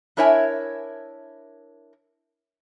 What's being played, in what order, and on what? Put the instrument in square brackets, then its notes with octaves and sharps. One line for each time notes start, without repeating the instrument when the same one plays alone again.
[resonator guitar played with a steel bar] D4 E4 A#4 C#5 E5 G#5